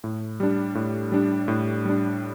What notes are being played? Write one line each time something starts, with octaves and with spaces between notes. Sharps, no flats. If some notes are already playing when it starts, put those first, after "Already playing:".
A2
G3 D4
A2
G3 D4
A2
G3 D4